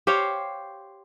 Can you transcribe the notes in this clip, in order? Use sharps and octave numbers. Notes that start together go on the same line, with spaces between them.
G4 C5 C#5 F5